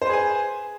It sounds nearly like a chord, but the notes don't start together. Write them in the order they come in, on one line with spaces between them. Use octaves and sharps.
C5 B4 G#4 G#5